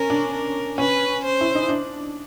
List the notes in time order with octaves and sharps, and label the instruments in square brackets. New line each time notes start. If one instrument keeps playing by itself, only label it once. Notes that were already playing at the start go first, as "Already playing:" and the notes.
Already playing: [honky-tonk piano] C#4 [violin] A#4
[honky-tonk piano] D4
[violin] A#4
[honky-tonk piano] C#4 [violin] B4
[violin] C5
[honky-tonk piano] E4
D#4
D4